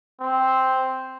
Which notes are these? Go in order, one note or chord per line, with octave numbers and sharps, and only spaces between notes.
C4